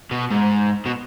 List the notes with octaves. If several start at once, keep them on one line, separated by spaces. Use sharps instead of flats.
B2
G#2
B2